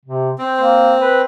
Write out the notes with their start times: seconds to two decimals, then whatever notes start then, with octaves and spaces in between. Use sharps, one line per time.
0.05 C3
0.38 C4 C5
0.60 A#3
1.00 B4